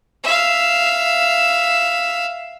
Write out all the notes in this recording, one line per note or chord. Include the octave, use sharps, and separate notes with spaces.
E5 F5